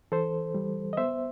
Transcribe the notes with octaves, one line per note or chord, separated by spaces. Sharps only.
E3 A4 C5
G3
D#5
B3 C5 E5